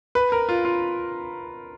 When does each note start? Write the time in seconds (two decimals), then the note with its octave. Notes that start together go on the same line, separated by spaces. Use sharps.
0.15 B4
0.32 A#4
0.49 F4
0.65 F4